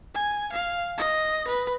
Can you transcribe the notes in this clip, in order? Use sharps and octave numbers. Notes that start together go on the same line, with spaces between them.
G#5
F5
D#5
B4